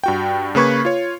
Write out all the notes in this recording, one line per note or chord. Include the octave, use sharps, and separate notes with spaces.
G2 F#4 G5
C#3 A#3 B4 C#6 G#6
F4 C#5